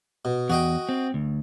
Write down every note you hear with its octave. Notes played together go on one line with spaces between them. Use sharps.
B2
E2 F#4 D#5 G5
C4
D2